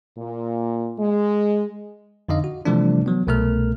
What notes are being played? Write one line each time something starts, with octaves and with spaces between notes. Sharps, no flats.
A#2
G#3
F2 D3 D#4 D#5 F5
F#4
C3 E3 F3 G3 A3 D4
E3 F#3 B3
C2 B2 A3 A#4 F6